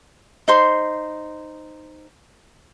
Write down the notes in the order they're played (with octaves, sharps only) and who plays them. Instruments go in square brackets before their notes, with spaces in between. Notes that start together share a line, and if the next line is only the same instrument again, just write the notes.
[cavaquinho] D#4 C5 C6